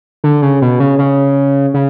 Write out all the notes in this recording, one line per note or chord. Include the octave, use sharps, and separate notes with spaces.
D3
C#3
B2
C#3
C#3
C#3